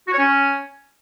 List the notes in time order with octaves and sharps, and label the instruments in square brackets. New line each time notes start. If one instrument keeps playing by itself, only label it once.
[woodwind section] F#4
C#5
C#4